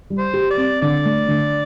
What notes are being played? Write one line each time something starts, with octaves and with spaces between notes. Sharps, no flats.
G3
C5
G4
D5
C4
D3 D5
A3
D3